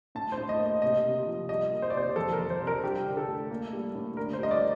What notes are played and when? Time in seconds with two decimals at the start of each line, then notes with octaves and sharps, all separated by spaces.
0.15 A2 A5
0.32 C5
0.38 A2
0.49 D#5
0.60 A#3
0.66 D#5
0.82 C3 D#5
1.05 C3
1.27 F3
1.49 G3 D#5
1.71 A#3
1.82 C5
1.90 D5
1.94 C3 C5
2.16 F2 A4
2.33 A#4
2.39 F2
2.50 C5
2.61 C3
2.67 A#4
2.83 G2 G4
3.06 D3
3.17 A4
3.28 A3
3.50 A#3
3.73 G3
3.95 A2
4.17 D3 A#4
4.33 C5
4.39 G3 D#5
4.51 D5